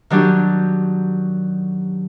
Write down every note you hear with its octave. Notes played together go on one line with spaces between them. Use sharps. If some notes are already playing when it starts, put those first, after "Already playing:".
D#3 F#3 D4 G4